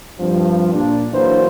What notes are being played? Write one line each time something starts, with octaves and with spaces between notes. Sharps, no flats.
G2 F3 C4
A#2 D4
E3 F#3 A#3 D4 B4 C5